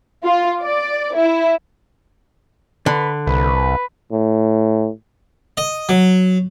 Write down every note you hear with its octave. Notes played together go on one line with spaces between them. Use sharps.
F4
D5
E4
D3 B4
C2 B4
A2
D#5
F#3